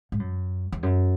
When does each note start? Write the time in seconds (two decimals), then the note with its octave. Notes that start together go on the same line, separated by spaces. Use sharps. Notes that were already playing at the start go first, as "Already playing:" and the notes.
0.12 G#2
0.19 F#2
0.72 E2
0.83 F#2